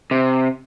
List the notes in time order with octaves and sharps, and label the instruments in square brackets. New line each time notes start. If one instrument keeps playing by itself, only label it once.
[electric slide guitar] C3